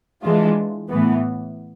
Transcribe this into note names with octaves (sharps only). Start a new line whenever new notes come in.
E3 G#3 D4 F4
A2 E3 B3